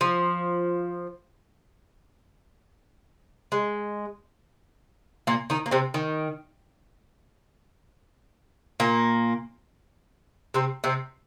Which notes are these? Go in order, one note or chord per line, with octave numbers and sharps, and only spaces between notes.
F3
G#3
A#2 A#3
D#3 D#4
A#3
C3 C4
D#3
A#2 A#3
C3 C4
C3 C4